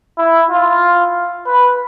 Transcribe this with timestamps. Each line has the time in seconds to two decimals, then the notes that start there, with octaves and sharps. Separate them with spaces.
0.18 E4
0.50 F4
1.47 B4